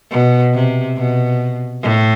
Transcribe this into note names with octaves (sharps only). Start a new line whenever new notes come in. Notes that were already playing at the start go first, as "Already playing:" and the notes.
B2
C3
B2
A2